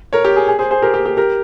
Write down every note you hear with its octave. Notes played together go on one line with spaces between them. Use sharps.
A#4 C#5
G4
G#4
G#4
G#4 C5
G#4 C5
G4 A#4
G4
G4
G4 A#4